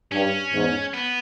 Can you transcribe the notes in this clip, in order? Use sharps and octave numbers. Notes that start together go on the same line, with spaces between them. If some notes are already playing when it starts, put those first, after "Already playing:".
G2 C#4
E2 G#2
B3